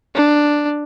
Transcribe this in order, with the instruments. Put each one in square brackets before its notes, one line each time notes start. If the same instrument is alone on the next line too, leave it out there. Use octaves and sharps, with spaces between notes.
[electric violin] D4